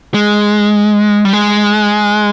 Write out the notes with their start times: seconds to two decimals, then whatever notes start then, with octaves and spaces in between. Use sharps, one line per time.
0.14 G#3
1.25 G3
1.33 G#3